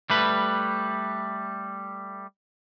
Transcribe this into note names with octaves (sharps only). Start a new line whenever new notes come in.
G3 A3 B4